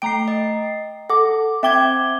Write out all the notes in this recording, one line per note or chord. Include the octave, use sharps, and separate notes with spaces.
A3 G5 A#5 C7 D7
D#5
A4 F#5 D6
C4 E5 G5 D6 G#6 G7